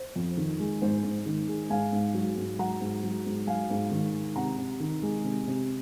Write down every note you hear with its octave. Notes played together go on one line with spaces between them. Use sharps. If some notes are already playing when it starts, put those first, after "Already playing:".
Already playing: C5
F2
D#3
G#3
G#2 C5
G#2
D#3
G#3
G#2 F5 G#5
G#2
F#3
G#2
F#3 F#5 A#5
G#2
F#3
G#2
F#3 F5 G#5
G#2
D#3
G#3
C3 F#5 A#5
C3
D#3
G#3
C3
C3